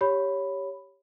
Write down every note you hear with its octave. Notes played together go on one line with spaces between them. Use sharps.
G4 C#5 B5